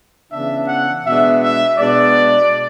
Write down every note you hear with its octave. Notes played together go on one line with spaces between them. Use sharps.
C#3 E3 B3 D4 E5
F#5
B2 G#3 B3 D4 E5
E5
B2 G#3 B3 D4 D5